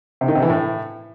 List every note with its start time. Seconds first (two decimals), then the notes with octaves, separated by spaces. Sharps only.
0.21 C3
0.28 D#3
0.35 C3
0.42 E3
0.50 A2